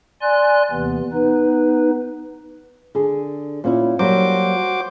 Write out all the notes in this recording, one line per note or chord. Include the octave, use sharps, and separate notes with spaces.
D5 G#5 C6 F#6
D#2 C3 E3 B3
B3 D#4 B4
D3 G#4
A#2 C#4 E4
F#3 G3 A#3 F#4 C5 D6